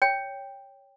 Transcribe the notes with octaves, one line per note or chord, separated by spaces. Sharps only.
C#5 G5